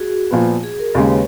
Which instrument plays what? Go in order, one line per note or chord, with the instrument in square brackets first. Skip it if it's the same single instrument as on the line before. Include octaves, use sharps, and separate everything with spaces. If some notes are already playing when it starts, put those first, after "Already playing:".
Already playing: [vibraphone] F#4 G#4
[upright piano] A#2 F3 B3
[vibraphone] G#4
A#4
[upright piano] D#2 C#3 G#3 [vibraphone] C#5
[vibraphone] B4